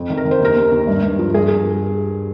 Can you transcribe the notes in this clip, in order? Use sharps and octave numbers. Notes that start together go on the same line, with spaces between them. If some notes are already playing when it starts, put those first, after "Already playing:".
Already playing: F2
D#3
A#4
D#3
C5
D#2 A#4
D#2
D#2
G2
G2
F3
G2 G#4
G#4